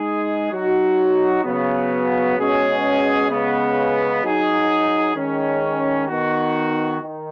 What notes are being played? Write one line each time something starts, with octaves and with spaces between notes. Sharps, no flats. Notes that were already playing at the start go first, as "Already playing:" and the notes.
Already playing: G#3 D#4 G#4
F#3 D#4 F#4
C#3 F#3 B3
B2 G#3 C#4 G#4
C#3 G#3 B3
F#3 D#4 G#4
D#3 G#3 C#4
D#3 B3 D#4 F#4
D#3